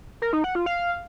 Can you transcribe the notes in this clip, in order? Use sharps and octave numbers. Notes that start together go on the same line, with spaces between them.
A#4
D#4
F#5
F4
F5